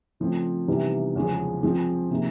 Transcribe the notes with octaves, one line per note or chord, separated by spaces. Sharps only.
C#3 F3 A3 C4 F4
C3 E3 G3 B3 D#4
E2 C#3 F3 G#3
F3 G#3 C4 F4
C3 F3 A#3 D#4